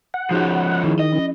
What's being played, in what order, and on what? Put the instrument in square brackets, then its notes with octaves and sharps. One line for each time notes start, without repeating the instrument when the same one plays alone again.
[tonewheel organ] F#5
[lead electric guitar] F3 C#4 [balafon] D#4 F#4 G#4
[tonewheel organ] D#3 [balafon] E4 G#4
[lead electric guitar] D#5
[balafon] F3 C#4